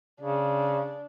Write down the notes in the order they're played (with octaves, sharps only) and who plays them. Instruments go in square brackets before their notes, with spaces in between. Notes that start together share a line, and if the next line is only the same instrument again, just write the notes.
[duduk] C#3 [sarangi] D4